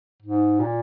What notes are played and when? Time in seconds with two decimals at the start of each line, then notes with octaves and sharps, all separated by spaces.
0.22 G#2
0.60 A#2